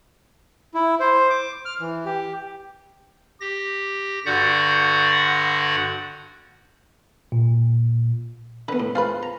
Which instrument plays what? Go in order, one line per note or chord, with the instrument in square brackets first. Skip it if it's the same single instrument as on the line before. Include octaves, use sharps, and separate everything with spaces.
[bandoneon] E4
C5
D6
F6
E3
G4
[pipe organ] G4 A#6
G2 D3 F#4 D5 F#5 G6
[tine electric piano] A#2
[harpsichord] D3 B3 [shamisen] B4
[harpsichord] A2
[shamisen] F4 G#4 B4 [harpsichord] C5
[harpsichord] A#5